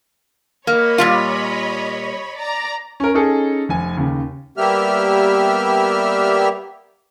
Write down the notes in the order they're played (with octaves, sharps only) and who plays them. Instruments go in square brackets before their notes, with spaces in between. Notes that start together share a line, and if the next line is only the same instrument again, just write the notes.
[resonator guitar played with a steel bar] A#3 [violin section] C#5 D#5 B5
[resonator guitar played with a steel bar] A#2 G3 F4
[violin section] D5 A#5
[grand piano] C#4 A#4
C#4 D#4 G#4 A4
F1 G#5
D#2 C#3
[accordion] G3 A#3 B3 G4 E5 F6